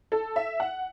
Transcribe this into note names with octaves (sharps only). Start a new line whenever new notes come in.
A4
E5
F#5